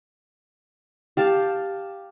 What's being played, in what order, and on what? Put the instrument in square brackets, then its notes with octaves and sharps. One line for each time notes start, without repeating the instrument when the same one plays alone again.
[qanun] G4 F5 A5